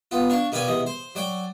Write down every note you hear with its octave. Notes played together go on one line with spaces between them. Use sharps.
B3 F4
D4 F5 C#6
B2 A#3 G4 B4 D5 G#5
E2 C3 D#5
C5
F#3 D5 G5